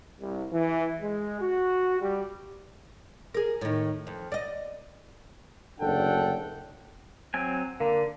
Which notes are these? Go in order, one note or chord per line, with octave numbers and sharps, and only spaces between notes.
C2
E3
G#3
F#4
G3
G#4 A#4
A2 D#3
F2
D5 D#5
F#1 D2 D4 A4 F#5 G5
F#3 C4 G#5
D3 A#3